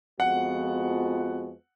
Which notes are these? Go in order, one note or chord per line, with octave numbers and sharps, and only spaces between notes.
F2 F3 G#3 B3 F#4 F#5